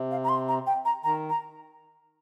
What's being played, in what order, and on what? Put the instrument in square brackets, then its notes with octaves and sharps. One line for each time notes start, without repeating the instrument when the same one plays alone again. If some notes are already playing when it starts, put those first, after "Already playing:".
Already playing: [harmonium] C3
[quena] F5
A#5
C6
A#5
G5
A#5
[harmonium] D#3 [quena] A#5
[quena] A#5